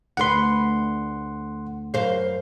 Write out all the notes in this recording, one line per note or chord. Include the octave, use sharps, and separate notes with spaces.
D2 B4 F#5 C6
F#2 C5 F5